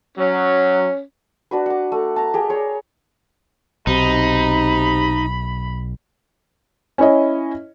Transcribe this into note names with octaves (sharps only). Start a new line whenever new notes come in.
F#3 C#4
D4 F#4 B4
F#5 D6
A3
A5 A#5
G4 G#4 A#4
G#4 C#5
B1 C3 D#4 B5
C#4 E4 C#5 D#5